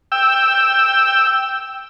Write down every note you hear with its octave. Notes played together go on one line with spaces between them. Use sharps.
G5 E6